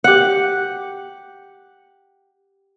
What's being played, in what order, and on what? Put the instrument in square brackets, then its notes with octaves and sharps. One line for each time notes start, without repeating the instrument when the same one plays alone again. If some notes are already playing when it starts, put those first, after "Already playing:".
[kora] G4 F#5